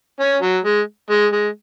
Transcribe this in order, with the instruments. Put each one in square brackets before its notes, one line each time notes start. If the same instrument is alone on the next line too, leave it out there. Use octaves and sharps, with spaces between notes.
[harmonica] C#4
F#3
G#3
G#3
G#3